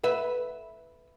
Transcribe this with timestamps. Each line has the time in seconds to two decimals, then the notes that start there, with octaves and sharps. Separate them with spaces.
0.04 B4 E5